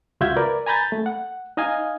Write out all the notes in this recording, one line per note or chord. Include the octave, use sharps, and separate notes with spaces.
C#2 F4 F#4 E5 G6 G#6
A#4 B4 D5
G#5 A#5 B5 G6 A6
A3
F#5
D#4 D#5 F5 G#5